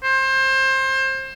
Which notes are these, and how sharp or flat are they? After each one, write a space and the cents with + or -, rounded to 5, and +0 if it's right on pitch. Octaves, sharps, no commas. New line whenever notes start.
C5 +25